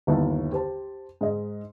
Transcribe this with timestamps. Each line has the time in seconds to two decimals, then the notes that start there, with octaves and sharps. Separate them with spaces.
0.07 G1 D#2 D#4 E4 E5 A5
0.52 G4 C5 A5
1.21 G#2 D#5